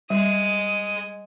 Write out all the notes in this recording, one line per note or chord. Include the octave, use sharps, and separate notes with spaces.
G3 G#3 D#6